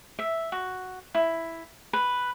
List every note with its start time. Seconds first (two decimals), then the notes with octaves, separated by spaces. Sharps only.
0.19 E5
0.52 F#4
1.15 E4
1.93 B4